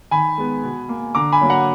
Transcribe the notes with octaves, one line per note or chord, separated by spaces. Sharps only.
D#3 G#5 B5
G#3 B3
B2
A#3
D3 A#5 D6
G#5 B5
F#3 A#3
F#5 A#5